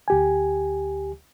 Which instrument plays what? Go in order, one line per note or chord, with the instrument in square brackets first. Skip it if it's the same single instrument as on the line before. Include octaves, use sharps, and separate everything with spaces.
[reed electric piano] D2 G4 G#5